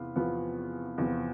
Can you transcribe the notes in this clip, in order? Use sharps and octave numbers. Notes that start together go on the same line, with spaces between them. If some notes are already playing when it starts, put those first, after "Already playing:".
Already playing: E2 C3 B3 F4
E2 C3 F3 B3 F4
E2 C3 F3 B3 F4